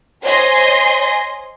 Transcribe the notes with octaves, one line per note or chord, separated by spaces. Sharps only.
C5 C#5 D#5 G#5 C6